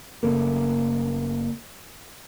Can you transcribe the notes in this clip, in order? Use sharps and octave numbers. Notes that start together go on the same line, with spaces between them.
F#1 C#3 A3 A#3